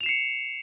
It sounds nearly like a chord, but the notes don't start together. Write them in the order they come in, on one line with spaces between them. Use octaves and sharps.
F7 E7 C7 C#7